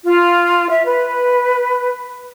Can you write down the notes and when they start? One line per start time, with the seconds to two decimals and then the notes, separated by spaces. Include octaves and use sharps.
0.05 F4
0.70 E5
0.86 B4